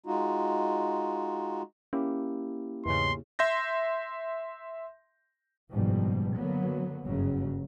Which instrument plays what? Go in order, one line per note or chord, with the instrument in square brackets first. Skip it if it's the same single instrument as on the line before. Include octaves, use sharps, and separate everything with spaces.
[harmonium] G#3 D#4 F4 F#4
[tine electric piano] A#3 E4 G4 [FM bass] C#4
[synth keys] E2 G#2 C#3 [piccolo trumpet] C6
[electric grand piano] E5 C6 G6 A#6
[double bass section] F#1 G#2 B2 F3 G3
D3 F#3 A#3 B3
F#1 G2 C#3 F#3